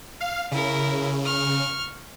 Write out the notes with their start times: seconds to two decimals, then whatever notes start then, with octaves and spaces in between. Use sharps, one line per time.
0.20 F5
0.52 C#3 E4 A#4
1.25 C#6 F6